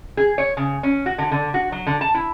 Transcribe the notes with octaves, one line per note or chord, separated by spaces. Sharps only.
G#4
C#5
C#3
C#4
F#4
D3
D3
F#4
F#3
D3
A5
E4